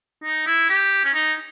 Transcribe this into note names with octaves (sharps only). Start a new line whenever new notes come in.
D#4
E4
G4
C#4
D#4